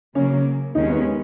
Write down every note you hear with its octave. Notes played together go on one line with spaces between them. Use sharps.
C#3 F#3 A#3 C#4
D#2 D#3 G#3 C#4 D#4
B3